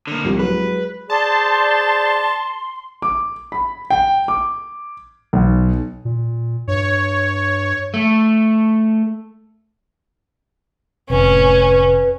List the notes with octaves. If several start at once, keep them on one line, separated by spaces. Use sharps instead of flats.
D3 A#3
C2 F3 G3
F#3 G#3 B4
G#4 C5 D5 A5 C6
D6
B5
G5
D6
B1
A#2
G2 C#5
A3
F1 A2 C3 C#4 B4